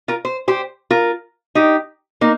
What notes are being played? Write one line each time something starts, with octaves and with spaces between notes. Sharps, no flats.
F4 A#4
C5
G4 C5
F4 A#4
D#4 G4
A#3 D#4